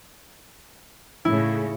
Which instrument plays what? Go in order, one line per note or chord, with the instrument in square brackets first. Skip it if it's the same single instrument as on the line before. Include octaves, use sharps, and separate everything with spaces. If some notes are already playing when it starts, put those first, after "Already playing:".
[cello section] A2 C#3 [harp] E4